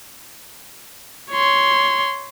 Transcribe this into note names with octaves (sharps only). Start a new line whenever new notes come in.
C#5 C6